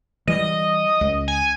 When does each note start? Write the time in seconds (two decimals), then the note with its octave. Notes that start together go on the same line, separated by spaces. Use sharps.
0.27 E3 G3 D#5
1.01 C#2
1.28 G#5